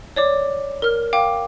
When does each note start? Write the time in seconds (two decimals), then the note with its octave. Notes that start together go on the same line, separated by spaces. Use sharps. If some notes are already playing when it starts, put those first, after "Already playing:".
0.16 C#5 D5 D6
0.82 A#4 F6
1.13 F5 G5 D6